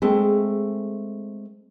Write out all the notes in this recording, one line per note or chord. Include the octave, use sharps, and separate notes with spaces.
G#3 A3 C4